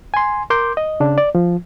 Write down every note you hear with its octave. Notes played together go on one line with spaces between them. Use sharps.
G#5 C6
A#4 C6 D6 G6
D#5
C#3 D4
D5
F3